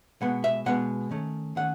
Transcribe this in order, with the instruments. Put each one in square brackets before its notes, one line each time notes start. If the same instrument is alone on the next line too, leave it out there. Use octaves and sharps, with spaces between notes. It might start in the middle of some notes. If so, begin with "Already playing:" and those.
[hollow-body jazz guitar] B2 G#3 B3 F#5
E5
B2 G#3 B3 F#5
D#3 A3 C#4
D#3 A3 C#4 F#5